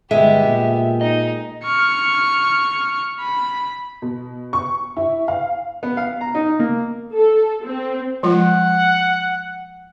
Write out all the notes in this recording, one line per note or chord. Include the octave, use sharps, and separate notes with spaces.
G1 G#3 B3 G4 E5
A#2
D#4 D#5
C#6 F6
B5
B2
C#6
E4
F5
B3
F5
A#5
D#4
A#3
A4
C4
F3 G#3 F4 F#5